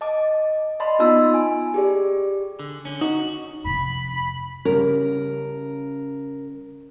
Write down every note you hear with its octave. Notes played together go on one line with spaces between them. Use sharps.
D#5 A5 D6
D5 D#5 A5 B5 C6
A#3 B3 D#4 F4 A5 E6
G#5
G4 G#4 D5
D3
D3 C#4
D#4 F#4
F2 C3 B5
C#3 G3 C#4 A#4